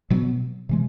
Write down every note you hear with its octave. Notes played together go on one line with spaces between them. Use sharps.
B2 F#3 B3
C3 E3 G#3